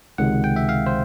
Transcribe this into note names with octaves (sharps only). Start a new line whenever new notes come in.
C#2 C3 D#3 G#3 F#5
G5
E5
F5
C5